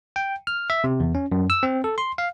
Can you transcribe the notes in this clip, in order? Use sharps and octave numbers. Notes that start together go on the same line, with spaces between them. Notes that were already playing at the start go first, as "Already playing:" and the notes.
G5
F6
E5
C3
E2
C#4
F#2
E6
C4
A4
C6
F5